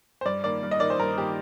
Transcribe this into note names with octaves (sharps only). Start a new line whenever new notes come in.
C5
G2 D5
D#3 A#3 D5
G2
D#5
D#3 A#3 D5
C5
G2 A#4
D#3 A#3 G4